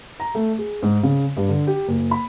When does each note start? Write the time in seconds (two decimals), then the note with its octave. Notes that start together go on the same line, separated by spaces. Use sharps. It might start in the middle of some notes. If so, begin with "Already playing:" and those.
0.20 A#5
0.35 A3
0.58 G#4
0.82 G#2
1.03 C#3
1.37 G2
1.49 D3
1.67 G4
1.88 F#1
2.11 B5